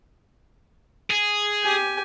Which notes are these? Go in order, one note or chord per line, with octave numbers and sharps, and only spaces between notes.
G#4
G4 G#5